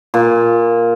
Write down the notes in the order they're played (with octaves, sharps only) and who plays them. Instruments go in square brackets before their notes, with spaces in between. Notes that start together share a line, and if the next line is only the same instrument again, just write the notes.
[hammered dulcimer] A#2